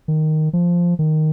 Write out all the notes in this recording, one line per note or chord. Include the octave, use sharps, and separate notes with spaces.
D#3
F3
D#3